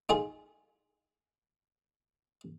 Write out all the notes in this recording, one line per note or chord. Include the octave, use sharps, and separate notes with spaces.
D#4 F4 G#4